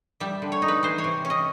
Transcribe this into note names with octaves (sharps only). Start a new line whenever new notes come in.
G3 E5
D3
C#5
D#4
B4
E3 C5
C#5
C3
C#4
D#5